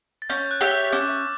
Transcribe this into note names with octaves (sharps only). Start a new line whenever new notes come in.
A6
C#4 G6
F#6
G4 C#5 E5
E6
C#4 D6